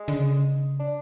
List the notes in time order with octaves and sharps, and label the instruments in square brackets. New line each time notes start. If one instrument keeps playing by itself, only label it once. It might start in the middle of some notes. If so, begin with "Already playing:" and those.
Already playing: [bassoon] G#3
[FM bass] D3
C#3
[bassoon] D4